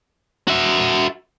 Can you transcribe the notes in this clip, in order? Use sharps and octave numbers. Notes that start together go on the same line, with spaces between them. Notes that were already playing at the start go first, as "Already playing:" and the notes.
F#4 E5